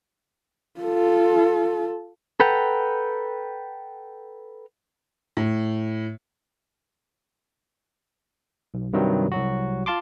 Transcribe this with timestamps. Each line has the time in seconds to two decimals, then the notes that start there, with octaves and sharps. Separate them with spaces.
0.80 F4 A4
2.40 A4 B4 F#5 G5 A#5
5.37 A2
8.74 B1
8.93 G2 C3 D#3 F#3 G3
9.32 C2 F#3 F#4
9.86 F4 F5 A5 C6 D6